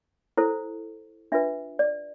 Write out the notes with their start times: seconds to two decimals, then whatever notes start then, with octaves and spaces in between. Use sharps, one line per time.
0.37 E4 A4 C5
1.32 D4 F4 B4 E5
1.79 D5